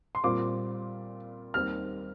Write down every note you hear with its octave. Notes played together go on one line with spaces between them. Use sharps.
C6
A#2 G3 C4 F4 D6
D#2 D#3 G3 C4 F6